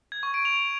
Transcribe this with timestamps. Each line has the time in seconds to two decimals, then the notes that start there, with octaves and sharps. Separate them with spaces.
0.12 G#6
0.23 C#6
0.34 D7
0.45 F7